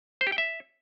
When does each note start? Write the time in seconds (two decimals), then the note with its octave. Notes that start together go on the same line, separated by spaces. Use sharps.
0.21 C5
0.27 G4
0.32 G5
0.38 E5